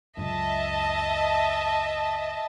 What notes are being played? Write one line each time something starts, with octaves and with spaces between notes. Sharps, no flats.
C#2 F#2 D#5 E5 A5